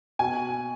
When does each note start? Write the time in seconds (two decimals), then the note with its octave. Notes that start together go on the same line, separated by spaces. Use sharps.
0.19 B2 G#5